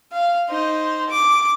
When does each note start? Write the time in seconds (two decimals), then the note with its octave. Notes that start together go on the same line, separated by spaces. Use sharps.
0.12 F5
0.50 D#4 C5
1.10 D6